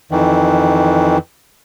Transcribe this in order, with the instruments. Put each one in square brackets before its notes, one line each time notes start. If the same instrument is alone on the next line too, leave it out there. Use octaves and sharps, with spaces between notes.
[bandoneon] F2 D#3 E3